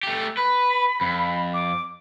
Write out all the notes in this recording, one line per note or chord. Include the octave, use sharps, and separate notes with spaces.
A3 G4
B4 B5
F2
D6